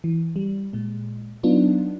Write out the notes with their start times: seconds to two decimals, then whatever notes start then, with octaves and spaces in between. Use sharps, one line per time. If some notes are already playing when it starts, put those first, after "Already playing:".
0.04 E3
0.36 G3
0.73 A#2 G#3
1.43 F#3 B3 D4 D#4 F4